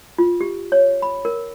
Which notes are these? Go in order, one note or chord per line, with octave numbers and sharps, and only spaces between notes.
F4
G4
C#5
B5
A#4